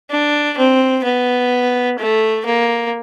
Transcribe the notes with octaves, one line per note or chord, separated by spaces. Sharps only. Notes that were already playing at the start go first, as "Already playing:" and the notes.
D4
C4
B3
A3
A#3